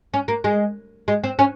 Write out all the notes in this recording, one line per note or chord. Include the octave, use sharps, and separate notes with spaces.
C#4
A#3
G#3
G#3
C4
C#4